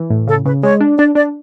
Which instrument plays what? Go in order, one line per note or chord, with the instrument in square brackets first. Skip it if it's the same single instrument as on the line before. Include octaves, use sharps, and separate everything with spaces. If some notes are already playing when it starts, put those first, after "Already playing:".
Already playing: [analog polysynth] E3
A2
[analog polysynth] C#3 [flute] A4
[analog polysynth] C#3 [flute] B4
[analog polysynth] G#3 [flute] C#5
[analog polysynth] D4
[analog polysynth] D4 [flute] D5
[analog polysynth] D4 [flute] D5